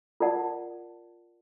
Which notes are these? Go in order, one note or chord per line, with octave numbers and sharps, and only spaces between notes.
F4 A#4 D5 F#5 A5